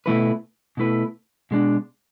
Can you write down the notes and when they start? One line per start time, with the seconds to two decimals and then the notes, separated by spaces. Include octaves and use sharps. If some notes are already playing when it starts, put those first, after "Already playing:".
0.06 B2 A3 E4 B4
0.77 B2 A3 E4 B4
1.51 B2 G#3 D4